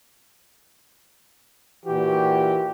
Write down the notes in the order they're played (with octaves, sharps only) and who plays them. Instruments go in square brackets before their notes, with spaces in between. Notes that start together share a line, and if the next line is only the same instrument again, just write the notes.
[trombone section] A#2 E3 F#4 G4